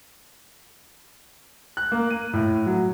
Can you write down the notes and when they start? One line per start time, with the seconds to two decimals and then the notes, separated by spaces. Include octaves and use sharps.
1.77 F#6
1.92 A#3
2.11 D#7
2.33 A2
2.66 F#3